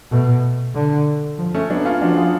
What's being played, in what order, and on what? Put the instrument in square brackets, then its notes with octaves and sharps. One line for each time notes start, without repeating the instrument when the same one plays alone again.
[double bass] B2 [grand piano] A3
[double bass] D3
F3
[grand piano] A3 C#4
[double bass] F#3 [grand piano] B3 D4
[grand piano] C#4 F4
[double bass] F3 [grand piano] D4 F#4
[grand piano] F4 G#4